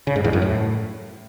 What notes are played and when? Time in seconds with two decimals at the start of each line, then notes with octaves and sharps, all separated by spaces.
0.07 C#3
0.16 G#2
0.24 E2
0.33 F#2
0.42 A2